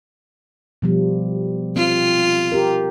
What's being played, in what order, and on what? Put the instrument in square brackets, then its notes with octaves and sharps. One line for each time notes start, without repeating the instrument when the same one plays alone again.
[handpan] B2 F3 G3
[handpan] C4 [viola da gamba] F4
[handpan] G4 A#4